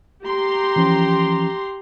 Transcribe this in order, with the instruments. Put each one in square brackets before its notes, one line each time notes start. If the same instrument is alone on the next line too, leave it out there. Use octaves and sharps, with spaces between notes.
[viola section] G4 A#5 C6
[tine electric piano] E3 F3 C#4